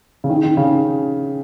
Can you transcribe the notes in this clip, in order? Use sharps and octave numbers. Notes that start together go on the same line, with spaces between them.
C#3
D#3
D#3
C#3